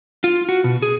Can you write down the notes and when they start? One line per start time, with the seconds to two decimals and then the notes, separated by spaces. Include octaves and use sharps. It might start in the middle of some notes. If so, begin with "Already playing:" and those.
0.24 F4
0.49 F#4
0.64 B2
0.82 G#4